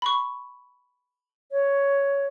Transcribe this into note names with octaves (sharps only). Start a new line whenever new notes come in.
B5 C#6
C#5